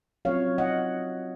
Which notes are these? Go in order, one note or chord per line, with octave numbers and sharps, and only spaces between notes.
F#3 C4 F4 C#5 F5
D#5 F#5